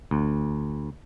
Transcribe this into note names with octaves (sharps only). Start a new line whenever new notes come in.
D2